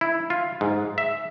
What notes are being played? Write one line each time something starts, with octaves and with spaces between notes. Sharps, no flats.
E4
F4
G#2
E5